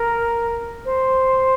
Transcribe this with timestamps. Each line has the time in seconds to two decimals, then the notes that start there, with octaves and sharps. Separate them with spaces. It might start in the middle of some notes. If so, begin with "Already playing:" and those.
Already playing: A#4
0.85 C5